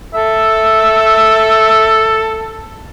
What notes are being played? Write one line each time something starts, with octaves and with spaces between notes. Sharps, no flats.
A4 E5